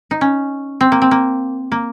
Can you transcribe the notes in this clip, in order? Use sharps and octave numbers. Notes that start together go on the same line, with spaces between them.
D#4
C#4
C4
A#3
C4
A#3
A#3